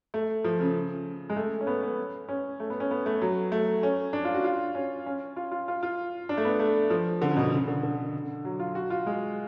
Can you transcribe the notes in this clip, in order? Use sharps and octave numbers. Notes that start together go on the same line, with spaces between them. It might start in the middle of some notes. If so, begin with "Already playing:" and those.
A3
F3
C#3
G#3
A3
C#4
B3
B3
C#4
A3
B3
C#4
B3
A3
F#3
A3
C#4
D4
F4
F#4
F4
C#4
C#4
F4
F4
F4
F4
D4
A3
B3
A3
F3
D3
C#3
B2
C#3
D3
D3
F#3
F4
F#4
F4
G#3